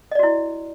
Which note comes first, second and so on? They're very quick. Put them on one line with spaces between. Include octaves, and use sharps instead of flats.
D#5 D5 F#4 E4